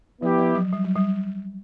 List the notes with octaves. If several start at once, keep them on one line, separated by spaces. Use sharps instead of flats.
F3 B3 E4 G4
F3
F#3
G3
F#3
G3